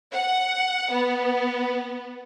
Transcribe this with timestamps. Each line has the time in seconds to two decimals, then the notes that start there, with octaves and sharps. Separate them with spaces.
0.13 F#5
0.91 B3